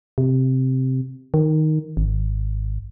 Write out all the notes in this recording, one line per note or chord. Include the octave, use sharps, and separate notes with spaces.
C3
D#3
G#1